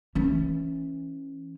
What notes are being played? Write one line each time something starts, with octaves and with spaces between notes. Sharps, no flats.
E3 C#4